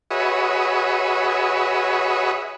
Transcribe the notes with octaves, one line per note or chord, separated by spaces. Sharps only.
F#4 G#4 B4 C#5 D#5 E5